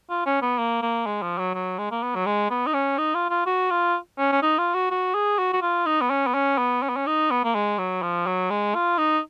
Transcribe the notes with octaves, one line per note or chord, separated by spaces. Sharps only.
F4
C#4
B3
A#3
A#3
G#3
F3
F#3
F#3
G#3
A#3
B3
F#3
G#3
B3
D#4
C#4
D#4
F4
F4
F#4
F4
C#4
C#4
D#4
F4
F#4
F#4
G#4
F#4
F#4
F4
D#4
B3
C#4
B3
C#4
B3
C#4
B3
C#4
D#4
B3
A#3
G#3
F#3
F3
F#3
G#3
F4
D#4